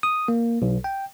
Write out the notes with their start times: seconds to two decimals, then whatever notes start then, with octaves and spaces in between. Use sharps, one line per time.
0.03 D#6
0.28 A#3
0.62 B1
0.84 G5